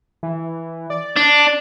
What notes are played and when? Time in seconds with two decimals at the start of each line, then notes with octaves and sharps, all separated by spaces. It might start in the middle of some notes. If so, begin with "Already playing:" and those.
0.23 E3
0.90 D5
1.16 D4